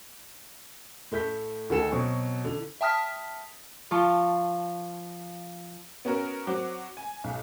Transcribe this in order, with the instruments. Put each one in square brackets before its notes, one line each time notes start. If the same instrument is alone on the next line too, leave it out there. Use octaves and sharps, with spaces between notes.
[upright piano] A2 A3 G6 B6
D2 D#3 F#4 G#4 A4 E7
B2 F#3 C4 C#6
D3 E3
[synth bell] E5 G5 A5 D#6 F6 B6
[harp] F3 F4 A5 C#6
[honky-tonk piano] B3 C#4 F#4 A#4
F#3 C4 F#5 D6
G#5
B1